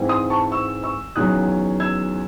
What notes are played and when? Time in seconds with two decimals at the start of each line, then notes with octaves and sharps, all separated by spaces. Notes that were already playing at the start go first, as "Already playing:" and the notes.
Already playing: G#2 E3 C4
0.09 C6 D#6
0.30 A5 C#6
0.52 C#6 E6
0.83 C#6 E6
1.16 E2 D#3 F#3 C#4 D#6 F#6
1.80 E6 G#6